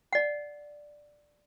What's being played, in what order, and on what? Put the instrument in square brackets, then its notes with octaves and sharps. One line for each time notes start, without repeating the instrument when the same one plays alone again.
[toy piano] D5 F#5